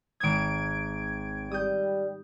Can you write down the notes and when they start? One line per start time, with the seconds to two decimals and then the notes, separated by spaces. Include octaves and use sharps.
0.20 G#1 D#6 G#6 D7
1.51 G3 D#6 G6